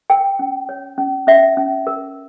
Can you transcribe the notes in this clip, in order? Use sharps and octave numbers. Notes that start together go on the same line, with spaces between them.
A#4 G5
C#4
C#5
C#4
C#4 E5
C#4
A#4